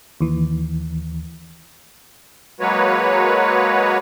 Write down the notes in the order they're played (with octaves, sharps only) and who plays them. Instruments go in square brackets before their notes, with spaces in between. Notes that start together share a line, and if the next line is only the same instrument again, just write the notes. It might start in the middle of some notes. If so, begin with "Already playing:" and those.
[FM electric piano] D#2 E3
[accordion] F#3 G#3 A#3 F#4 B4 C#5